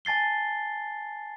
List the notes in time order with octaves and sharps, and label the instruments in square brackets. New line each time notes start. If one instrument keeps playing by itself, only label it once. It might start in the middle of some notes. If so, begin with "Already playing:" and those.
[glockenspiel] G#5 A5 A6 C7 G7